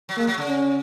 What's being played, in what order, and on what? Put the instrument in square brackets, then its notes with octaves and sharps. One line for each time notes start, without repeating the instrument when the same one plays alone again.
[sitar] F#3
[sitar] G#3 [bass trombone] A#3
[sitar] F#3
C#3
[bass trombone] C#4